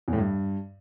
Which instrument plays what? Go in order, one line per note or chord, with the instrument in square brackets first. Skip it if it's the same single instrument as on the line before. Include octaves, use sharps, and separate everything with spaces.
[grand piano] E2
A2
G2